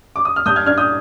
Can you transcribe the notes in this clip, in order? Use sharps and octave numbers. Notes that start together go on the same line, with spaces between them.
D6
D#6
F6
G2 D#6 G6
F6 G#6
D4 F6 G#6
D#6 G6